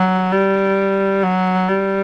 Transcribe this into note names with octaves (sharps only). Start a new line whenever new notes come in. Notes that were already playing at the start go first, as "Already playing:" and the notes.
Already playing: F#3
G3
F#3
G3